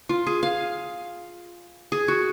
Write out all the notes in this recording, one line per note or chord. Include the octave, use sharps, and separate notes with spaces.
F4
G#4
F5
G#4
F#4